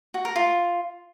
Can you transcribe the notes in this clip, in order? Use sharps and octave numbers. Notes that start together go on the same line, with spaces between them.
F#4
A#4
F4